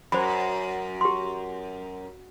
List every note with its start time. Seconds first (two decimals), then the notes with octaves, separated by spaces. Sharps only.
0.12 F#2 C5 B5
1.01 G4 C6